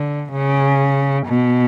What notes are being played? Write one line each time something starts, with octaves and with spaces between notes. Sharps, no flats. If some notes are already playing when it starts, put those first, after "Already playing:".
Already playing: D3
C#3
B2